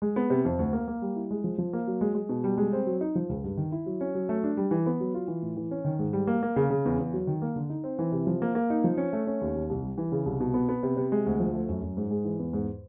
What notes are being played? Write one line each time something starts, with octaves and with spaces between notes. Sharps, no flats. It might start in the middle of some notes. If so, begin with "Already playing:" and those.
G#3
B3
C3
F2
D2
A#3
A#3
G3
E4
G#3
F3
F3
A#3
F#3
G#3
G#3
B2
G3
G#3
C4
F#3
D#4
F3
C#2
G2
D#3
E4
F#3
C#4
F#3
A3
D4
G3
E3
B3
F#3
F4
E3
A2
E3
C#4
D#3
G#2
G3
A#3
A#3
C#3
C#3
E2
E2
F#3
D#3
A#3
D3
D#4
C4
E3
C3
F3
A#3
A#3
D#4
F3
C#4
A3
C#4
D#2
D#2
C2
G3
E3
C#3
C2
B2
B3
B3
C3
C3
G#3
D2
F3
A3
F#2
F#2
G#2
G#3
E3
E2
G#2